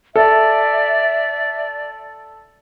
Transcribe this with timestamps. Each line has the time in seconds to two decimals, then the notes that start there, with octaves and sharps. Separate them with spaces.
0.16 A4 D5 E5